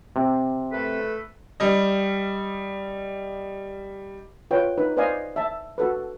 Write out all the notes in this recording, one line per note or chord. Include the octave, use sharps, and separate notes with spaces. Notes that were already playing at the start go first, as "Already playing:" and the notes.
C3
A3 A4 B4
G3 D#5
F4 B4 C#5 G5
D#4 B4
B4 C5 D5 D#5 F5 G#5
E5 A5
F#4 A4 B4